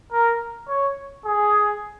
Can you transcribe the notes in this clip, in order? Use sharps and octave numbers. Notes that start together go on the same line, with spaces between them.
A#4
C#5
G#4